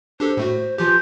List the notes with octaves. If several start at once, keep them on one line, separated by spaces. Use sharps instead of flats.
D4 G4 A4 C5
A2 A3 F#4
E3 F3 F4 G4 G6